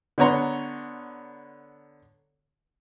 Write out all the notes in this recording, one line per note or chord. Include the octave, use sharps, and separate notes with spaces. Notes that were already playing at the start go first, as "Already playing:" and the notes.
D3 B3 C#5 A#5 C6